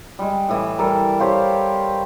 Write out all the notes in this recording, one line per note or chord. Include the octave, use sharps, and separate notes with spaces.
G3 G#3
A2 E3
G3 A4 A#4
G4 C5 C#5 F5